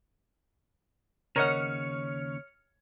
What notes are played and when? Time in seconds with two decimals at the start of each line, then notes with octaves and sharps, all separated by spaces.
1.36 D#2 C#3 A#4 C#5 D#5 F#5 F6 C#7